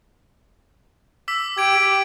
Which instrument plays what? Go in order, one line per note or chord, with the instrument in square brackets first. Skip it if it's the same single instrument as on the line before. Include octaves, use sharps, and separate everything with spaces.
[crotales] D6 E6 B6
[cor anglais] G4 [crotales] G#6 D7
[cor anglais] G4 [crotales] B6